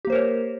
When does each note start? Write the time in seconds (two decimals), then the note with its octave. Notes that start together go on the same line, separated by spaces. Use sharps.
0.05 G4
0.07 A#3
0.10 C5
0.12 A#4
0.15 C#5